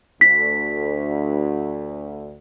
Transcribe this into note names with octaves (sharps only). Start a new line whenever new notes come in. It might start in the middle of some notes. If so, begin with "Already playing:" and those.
D2 B6